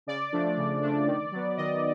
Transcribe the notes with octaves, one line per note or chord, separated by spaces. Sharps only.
C#3 D5
F3 A3 D4
C#3
F3 A3 D4
D#3
F#3 B3
D#3 D#5